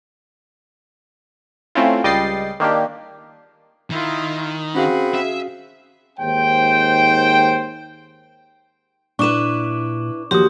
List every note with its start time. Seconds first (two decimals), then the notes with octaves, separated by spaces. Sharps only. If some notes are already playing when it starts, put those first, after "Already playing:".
1.75 A3 C4 C#4 E4 F4
2.04 C#2 G3 D#5 G5 A6 C7
2.60 D#3 A#3 D4 G4
3.90 D#3 E4 F4
4.75 C4 C#4 F#4 G#4 F5 F#5 B5
5.15 E5
6.19 D#2 G#2 C5 G5
9.19 A#2 D4 E4 B4 C#6 D6 E7
10.31 D#2 F3 F#4 G4 C6 D#6